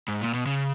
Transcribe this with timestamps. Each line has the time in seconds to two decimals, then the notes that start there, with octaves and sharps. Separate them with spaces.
0.08 G#2
0.21 A#2
0.34 B2
0.46 C#3